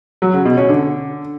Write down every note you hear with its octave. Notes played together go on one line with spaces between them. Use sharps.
F#3
C#3
B2
C#4
D3